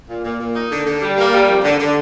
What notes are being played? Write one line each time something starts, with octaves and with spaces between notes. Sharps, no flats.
A#2
A#2
A#2
D#4
D3
D3
G3
A#3
G3
F2
D3
D3